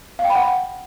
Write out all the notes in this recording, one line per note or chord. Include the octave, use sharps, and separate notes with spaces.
F5
G5
B5
F#5